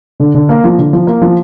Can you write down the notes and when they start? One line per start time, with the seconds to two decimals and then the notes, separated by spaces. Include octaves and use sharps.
0.20 D3
0.34 D3
0.49 A#3
0.64 F3
0.78 D3
0.93 F3
1.07 A#3
1.22 F3